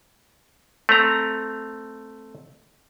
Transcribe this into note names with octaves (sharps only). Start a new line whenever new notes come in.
A3 C4 A#5